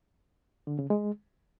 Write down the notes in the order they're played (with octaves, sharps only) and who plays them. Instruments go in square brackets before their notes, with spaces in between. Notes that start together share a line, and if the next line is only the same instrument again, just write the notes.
[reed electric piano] D3
C#3
G#3